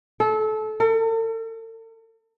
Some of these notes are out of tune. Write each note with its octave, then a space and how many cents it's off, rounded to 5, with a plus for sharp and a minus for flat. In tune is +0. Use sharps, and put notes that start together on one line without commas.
A4 -25
A4 +45